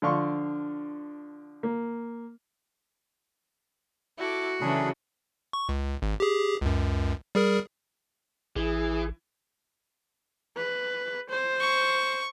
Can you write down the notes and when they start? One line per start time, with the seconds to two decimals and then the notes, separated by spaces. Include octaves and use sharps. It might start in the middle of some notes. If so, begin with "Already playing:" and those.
0.02 D3 F3 D4 F5 C6 C#6
1.63 A#3
4.18 E4 F#4 A4 D6
4.61 C#3 E3 F#3 A3 D4 G#4 B5
5.53 C#6
5.69 C#2
6.02 G#1
6.20 G4 G#4
6.61 C#2 F#2
7.35 G3 G#4 A#4
8.56 A1 E3 G#4
10.57 B4
11.29 C5
11.61 C#6